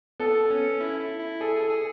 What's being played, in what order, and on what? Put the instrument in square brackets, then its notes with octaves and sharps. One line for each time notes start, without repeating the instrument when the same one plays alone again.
[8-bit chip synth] B3 [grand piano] A4
[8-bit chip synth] C#4
E4
E4
E4
[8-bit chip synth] G#4 [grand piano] A4
[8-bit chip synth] G#4 [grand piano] A4
[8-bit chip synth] G#4